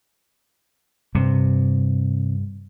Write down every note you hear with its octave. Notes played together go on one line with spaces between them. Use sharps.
G2 C3